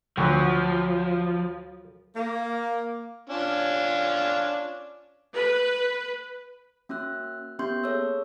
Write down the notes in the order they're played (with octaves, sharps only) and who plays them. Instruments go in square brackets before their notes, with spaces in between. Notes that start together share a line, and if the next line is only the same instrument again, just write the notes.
[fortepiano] D2 [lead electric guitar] F3 [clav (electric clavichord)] F#3 F#4
[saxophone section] A#3
[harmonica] C#4 D4 F4
[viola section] B4
[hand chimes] A#3 C#4 F#4 E6 F#6
A#3 B3 C#4 G4 C6 G6
G#4 A4 C#5 E6